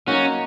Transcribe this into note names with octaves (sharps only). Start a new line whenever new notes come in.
F#3 A#3 C#4 D#4 F#4